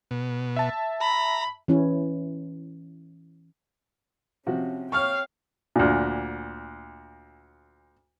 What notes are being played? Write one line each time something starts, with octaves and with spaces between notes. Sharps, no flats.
B2
E5 A5
A#5 B5
E3 C#4 E4
C3 F3 C#4 F#4
C#5 F5 G5 C#6 F6
D2 A#2